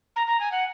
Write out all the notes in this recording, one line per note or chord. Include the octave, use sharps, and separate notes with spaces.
A#5
A#5
G#5
F#5